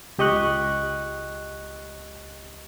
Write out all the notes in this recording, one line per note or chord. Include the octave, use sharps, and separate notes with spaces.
C#2 G4 D#5 C#6 F#6